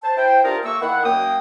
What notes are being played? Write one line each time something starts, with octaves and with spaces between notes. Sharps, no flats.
C5 A5
E4 C5 G5
A#3 D4 F4 G4 G#4 A#4
A3 A#3 C#6 E6
D#3 E4 F#5
F#2 A#3 G5 D#6